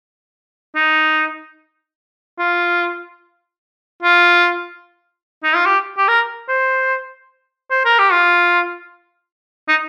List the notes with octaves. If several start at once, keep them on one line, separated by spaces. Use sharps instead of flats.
D#4
F4
F4
D#4
F4
G4
G4
A#4
C5
C5
A#4
G4
F4
D#4